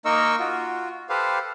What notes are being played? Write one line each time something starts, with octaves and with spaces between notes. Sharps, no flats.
A#3 D#4 A#4 D#5 C#6 E6
F4 F#4
G4 A4 B4 C5 F5